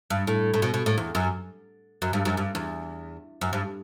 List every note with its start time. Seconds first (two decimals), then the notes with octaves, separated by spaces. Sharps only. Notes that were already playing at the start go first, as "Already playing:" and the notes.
0.10 G2
0.27 A2
0.54 A2
0.62 B2
0.74 B2
0.86 A2
0.98 E2
1.15 F#2
2.02 F#2
2.13 G2
2.25 F#2
2.37 G2
2.55 E2
3.41 F#2
3.53 G2